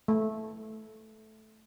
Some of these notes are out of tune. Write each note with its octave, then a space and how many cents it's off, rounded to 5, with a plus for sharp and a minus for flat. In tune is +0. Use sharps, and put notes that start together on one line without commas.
A3 -10